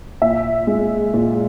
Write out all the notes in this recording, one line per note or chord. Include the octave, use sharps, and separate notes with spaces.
A#2 E5
G#3
A#2